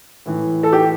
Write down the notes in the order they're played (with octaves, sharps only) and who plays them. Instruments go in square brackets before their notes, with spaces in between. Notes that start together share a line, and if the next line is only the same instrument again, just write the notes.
[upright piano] A2 E3
A4
G4